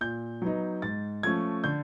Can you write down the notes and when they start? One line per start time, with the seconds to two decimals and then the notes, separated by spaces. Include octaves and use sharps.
0.01 A#2 G6
0.42 F#3 B3 D#4
0.82 G#2 A6
1.23 F3 A3 C#4 G#6
1.64 D3 G6